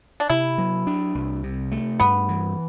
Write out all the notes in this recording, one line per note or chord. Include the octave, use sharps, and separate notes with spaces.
D4
C3 E4
F#3
D4
C2
C3
A3
G2 B3
E3